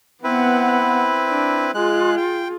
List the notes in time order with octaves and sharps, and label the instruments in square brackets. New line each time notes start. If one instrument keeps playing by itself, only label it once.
[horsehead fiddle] B3 F#5 [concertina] C4 E4 B4
[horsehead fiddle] D4
[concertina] G#3 F#6 [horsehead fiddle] F4 G#4
[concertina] G5